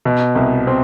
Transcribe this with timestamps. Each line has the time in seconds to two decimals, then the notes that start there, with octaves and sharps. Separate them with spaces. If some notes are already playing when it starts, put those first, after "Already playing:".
0.05 B2
0.35 C2
0.67 C4